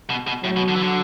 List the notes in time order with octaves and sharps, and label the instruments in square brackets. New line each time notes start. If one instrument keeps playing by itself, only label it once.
[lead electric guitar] B2
B2
[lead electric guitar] A2 [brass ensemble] F#3
[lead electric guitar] B2
D3
E3
D3